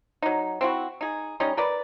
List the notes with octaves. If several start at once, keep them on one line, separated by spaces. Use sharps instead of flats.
F#3 D#4
C4 E4 F#4
D#4 G#4
G3 C#4 D#4 D#5
A#4 B4 D5